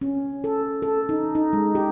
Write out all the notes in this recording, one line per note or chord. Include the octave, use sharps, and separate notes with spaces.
C#4
A4
A4
D#4
D#4
G#3
G4